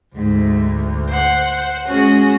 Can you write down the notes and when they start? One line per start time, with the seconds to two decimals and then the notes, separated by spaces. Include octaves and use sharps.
0.16 D2 G#2
1.09 C5 F#5
1.88 G#3 C#4 F#4 G#4